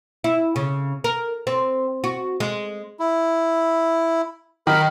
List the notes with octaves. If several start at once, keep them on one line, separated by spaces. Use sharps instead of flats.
E4
C#3
A#4
C4
F#4
G#3
E4
D#3 A#4 B5